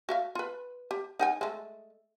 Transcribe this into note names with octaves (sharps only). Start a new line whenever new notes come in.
F#4 E5 F5
F4 B4
G4
D#4 F#5 G#5
G#3 A3